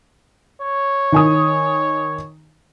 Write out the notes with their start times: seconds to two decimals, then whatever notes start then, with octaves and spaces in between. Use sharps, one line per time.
0.62 C#5
1.12 D#3 G#5 D#6